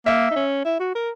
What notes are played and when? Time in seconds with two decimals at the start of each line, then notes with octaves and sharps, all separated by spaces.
0.06 A#3 E5
0.31 D#4
0.36 C#4
0.65 E4
0.80 F#4
0.95 A#4